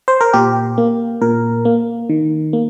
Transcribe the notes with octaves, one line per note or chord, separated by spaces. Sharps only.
C5
A#4
A#2 G4
A#3
A#2 A#4
A#3
D#3
A#3